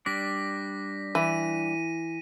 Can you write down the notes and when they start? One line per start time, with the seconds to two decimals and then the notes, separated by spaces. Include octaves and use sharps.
0.06 G3 D4 D5 A#6 B6
1.15 E3 D#7